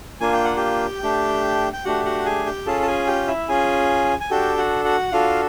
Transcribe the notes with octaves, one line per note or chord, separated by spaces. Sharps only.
A#3 D4 F4 G#5
G5
F#5
G4 G5
A3 D4 G4
G5
A3 D4 F#4 G4 F#5
F#4 F#5
G#4 G#5
G4 G5
C#4 F4 G#4 A4 A5
A5
G#4 G#5
G4 G5
E4 E5
C#4 F4 G#4 G#5
G#5
D4 F#4 G4 A4 G5
F#4 F#5
F#4 F#5
D4 F4 F#4 A4 F5